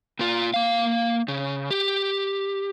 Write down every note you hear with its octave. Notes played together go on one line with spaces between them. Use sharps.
A#2 F4
A#3 F5
C#3
G4